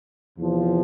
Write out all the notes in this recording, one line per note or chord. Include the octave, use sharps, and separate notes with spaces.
E2 C3 F3